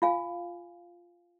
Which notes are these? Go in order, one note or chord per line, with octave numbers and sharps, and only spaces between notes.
F4 F5 G#5